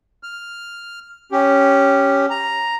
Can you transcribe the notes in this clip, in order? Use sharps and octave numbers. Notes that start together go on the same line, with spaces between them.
F6
C#4 G4
A#5